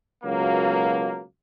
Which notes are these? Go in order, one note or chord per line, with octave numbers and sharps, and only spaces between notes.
C#2 B2 F#3 A#3